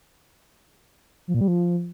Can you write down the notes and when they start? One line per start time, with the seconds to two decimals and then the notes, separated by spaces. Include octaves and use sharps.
1.28 F3
1.34 A#2
1.41 G3
1.48 F3